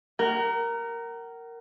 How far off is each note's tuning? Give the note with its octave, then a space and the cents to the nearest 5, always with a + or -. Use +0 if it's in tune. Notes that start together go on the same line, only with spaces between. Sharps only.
A#4 -5 F#5 +40